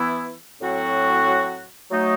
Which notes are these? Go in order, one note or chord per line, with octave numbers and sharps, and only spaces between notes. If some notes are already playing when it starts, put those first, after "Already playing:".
Already playing: E3 B3 E4
A2 F#3 C4 F#4
F#3 A3 D#4